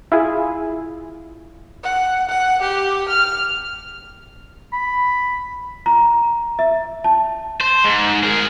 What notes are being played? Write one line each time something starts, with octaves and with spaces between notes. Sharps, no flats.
E4 F4 G#4
F#5
F#5
G4
F6
B5
A#5
E5
A5
C5
G#2
G#4 A#4